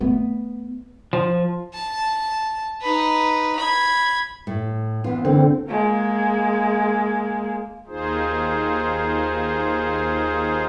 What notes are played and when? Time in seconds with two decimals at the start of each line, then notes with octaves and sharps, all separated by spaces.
0.01 A3 B3
1.13 F3
1.74 A5
2.82 D#4 B4
3.56 B5 G#6
4.47 A2
5.04 E3 B3 F4
5.25 D3 E3 A#3 C4
5.68 G#3 A#3
7.87 D#2 D#4 F4 G#4 C5